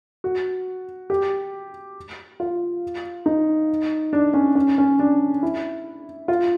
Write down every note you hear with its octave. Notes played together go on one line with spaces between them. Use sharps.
F#4
G4
F4
D#4
D4
C#4
C#4
C#4
D4
E4
F4